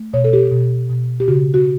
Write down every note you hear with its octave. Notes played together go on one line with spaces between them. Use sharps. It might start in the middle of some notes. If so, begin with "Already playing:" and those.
Already playing: A3
B2 C#5
A4
G4
B2
B2
G4
C#3 F#4
F#4